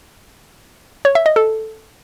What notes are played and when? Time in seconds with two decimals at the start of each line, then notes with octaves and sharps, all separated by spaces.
1.05 C#5
1.15 E5
1.26 D#5
1.36 A4